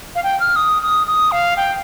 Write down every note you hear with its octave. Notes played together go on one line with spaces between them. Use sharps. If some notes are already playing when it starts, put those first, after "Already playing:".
F5
G5
F6
D#6
D#6
D#6
F5
G5